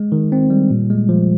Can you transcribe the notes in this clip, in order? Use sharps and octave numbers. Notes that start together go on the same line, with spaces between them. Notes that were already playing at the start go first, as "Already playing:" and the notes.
Already playing: G#3
D#3
C4
G3
A#2
G#3
F3